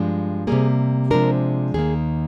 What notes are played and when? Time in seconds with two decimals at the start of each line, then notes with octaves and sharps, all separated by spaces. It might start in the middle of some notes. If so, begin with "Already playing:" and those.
Already playing: G2 F3 G#3 D4
0.47 C3 G3 A#3 G#4
1.10 C3 F3 G#3 D4 A#4
1.74 D#2 D#3 A#3 G#4